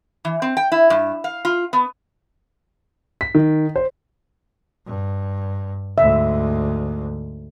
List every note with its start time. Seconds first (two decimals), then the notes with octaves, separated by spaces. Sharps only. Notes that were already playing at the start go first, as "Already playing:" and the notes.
0.25 E3
0.42 C4
0.57 G5
0.72 E4
0.90 G2
1.24 F5
1.45 F4
1.73 B3
3.21 B6
3.35 D#3
3.76 C5
4.86 G2
5.98 D2 G#2 E5